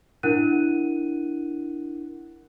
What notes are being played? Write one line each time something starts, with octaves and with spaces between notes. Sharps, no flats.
D4 E4 A#4 F#5 F#6 D#7